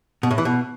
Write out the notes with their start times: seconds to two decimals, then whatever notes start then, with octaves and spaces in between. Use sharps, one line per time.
0.23 B2
0.31 A2
0.38 E3
0.45 B2